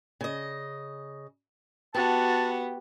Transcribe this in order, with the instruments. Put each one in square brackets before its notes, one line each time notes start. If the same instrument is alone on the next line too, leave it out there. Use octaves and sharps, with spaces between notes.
[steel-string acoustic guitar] C#3 D#5
[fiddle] B3 [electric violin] F#4 [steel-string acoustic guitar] G4 [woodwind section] A5